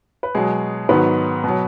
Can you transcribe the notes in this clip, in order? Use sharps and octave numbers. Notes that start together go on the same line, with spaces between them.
B4
B2 F#3 G#3 G#4
G#2 D#3 F#3 B3 B4
B2 F#3